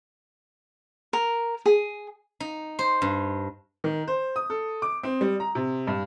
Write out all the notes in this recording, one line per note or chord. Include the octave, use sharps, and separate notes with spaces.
A#4
G#4
D#4
C5
G2
D#3
C5
D#6
A4
D6
C4
G3
A#5
C3
G2